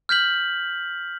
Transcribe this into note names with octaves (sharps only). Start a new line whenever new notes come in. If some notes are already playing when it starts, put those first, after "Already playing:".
F6 G6 B6 F#7